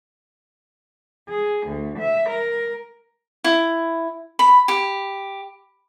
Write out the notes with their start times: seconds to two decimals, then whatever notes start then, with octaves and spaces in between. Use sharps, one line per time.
1.28 G#4
1.66 D2
1.98 E5
2.27 A#4
3.44 E4
4.39 B5
4.68 G4